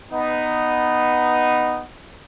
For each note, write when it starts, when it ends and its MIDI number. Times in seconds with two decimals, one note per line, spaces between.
0.12 1.83 59
0.12 1.83 63